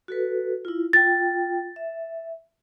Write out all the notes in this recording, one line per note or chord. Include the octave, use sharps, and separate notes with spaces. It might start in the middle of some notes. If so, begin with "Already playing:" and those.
F#4 A4 B4
E4 F4
F4 G5 A6
E5